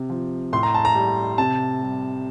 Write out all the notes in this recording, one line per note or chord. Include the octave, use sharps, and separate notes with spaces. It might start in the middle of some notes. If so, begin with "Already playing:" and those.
Already playing: C3
F3
A2 C6
A#5
A5
A#5
G3
C3 A5
G3